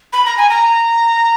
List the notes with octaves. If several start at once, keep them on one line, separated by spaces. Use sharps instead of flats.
B5
A#5
G#5
A#5